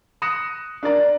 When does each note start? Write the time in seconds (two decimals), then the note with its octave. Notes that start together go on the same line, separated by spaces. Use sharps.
0.22 D#6 F#6 A#6 C#7 E7
0.83 D4 A#4 D5 A#5